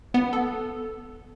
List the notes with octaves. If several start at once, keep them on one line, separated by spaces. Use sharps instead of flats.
B3
A4